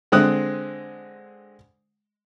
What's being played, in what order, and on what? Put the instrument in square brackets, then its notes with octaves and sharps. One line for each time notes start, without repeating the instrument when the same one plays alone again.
[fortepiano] D3 G#3 C4 D#6 F#6